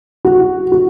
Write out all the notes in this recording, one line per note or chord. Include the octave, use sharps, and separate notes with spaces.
F#4
F#4